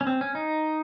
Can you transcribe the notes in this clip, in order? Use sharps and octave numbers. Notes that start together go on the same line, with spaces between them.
C#4
C4
C#4
D#4